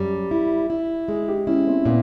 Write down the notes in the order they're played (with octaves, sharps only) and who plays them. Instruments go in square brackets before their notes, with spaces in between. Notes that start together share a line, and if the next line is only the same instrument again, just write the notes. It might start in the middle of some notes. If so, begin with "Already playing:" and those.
Already playing: [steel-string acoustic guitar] F#2 G3
E4
E4
[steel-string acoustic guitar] G#3 [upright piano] G#4
[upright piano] G4
[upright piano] C#4 [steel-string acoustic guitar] E4
[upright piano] C4
[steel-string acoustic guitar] A#2 [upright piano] B3